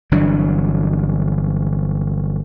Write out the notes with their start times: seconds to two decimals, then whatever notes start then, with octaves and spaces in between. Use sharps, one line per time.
0.11 G1 E3 F#3 D4